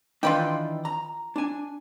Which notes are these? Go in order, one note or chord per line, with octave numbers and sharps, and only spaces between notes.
D#3 E3 D4 F4 B4 G5
A#5
D4 G#5